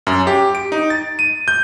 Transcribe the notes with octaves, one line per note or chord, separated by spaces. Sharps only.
F#2
G4
D7
D#4
A6
D#7
G6